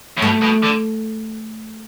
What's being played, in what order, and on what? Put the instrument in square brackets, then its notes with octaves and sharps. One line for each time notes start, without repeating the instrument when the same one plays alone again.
[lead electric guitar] A2
[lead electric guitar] B2 [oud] A3
[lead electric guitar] B2
D3